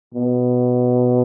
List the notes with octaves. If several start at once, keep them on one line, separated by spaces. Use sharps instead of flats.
B2